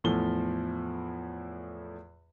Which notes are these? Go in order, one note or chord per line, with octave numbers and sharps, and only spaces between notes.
E2 A2 F3 G7